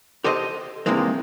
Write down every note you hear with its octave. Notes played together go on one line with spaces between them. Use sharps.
G4 A4 C5 D#5
G2 C3 D#3 E3 G#3 A#3